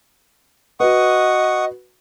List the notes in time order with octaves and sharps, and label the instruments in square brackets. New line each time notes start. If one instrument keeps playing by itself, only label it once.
[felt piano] F#4 B4 [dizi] D#5 [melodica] F#5 C#6 D#6